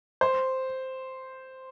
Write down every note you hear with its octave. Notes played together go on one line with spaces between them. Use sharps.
C5